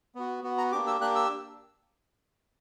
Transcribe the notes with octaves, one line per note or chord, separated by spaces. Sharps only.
B3 F#4
B3 F#4
A#5
A#3 D4 G4 D6
E6
A#3 D4 G4 F#6
E6